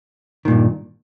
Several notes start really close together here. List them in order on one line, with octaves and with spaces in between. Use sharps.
D#3 A#2 G2